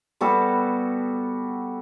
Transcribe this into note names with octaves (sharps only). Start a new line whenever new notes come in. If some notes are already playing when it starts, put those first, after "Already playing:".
G3 B3 F#4 A4